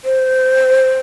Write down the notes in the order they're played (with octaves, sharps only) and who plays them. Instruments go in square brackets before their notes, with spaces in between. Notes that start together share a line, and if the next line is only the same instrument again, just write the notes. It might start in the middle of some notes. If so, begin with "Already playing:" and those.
[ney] C5